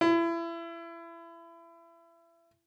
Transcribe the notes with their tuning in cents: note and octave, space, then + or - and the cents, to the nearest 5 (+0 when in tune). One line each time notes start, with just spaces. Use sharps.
E4 +30